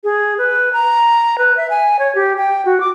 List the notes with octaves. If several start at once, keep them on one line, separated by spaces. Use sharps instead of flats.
G#4
B4
A#5
B4
E5
G#5
C#5
G4
G5
F#4
D6